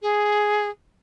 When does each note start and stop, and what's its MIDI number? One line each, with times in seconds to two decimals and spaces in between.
0.02 0.70 68